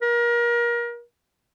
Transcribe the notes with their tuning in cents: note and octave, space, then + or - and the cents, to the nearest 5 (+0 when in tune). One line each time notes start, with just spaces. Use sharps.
A#4 +30